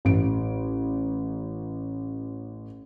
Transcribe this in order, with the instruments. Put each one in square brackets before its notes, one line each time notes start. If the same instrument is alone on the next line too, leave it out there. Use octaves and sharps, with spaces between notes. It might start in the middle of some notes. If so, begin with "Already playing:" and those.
[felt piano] A1 D7